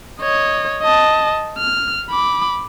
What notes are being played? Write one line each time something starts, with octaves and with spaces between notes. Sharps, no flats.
C#5 D#5
D#5 A5
F6
B5 D6